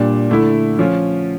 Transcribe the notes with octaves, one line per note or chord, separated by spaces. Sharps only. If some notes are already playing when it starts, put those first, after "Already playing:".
Already playing: A#2 G3 D4
D3 A3 E4
F3 C#4 F4